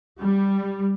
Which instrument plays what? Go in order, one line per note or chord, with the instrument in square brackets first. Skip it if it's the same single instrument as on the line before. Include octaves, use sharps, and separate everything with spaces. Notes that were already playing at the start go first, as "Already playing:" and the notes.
[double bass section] G3